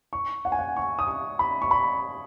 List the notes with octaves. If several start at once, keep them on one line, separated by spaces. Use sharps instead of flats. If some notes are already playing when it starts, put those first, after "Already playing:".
C#6
F#5
G#5
F#5
C#6
D#6
C#6
B5
C#6
B5